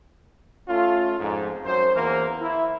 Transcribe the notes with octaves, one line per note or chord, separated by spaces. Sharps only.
A3 C#4 F4
F2 G#2
F#2 C5
E2 E3 A#3 A#4 C5
E4